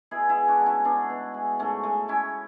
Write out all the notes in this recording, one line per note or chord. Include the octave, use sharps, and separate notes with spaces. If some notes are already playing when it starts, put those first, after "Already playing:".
B2 E4 G#4
E4 G#4
G#3
D4 F#4
G#3
C#4 E4
B2 B3 D4
B2
G#3
G#2 A3 C#4
G#3 A3
G#3 C#4 E4